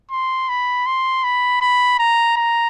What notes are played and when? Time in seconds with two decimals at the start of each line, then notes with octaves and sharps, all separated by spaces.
0.11 C6
0.49 B5
0.86 C6
1.24 B5
1.61 B5
1.99 A#5
2.37 A#5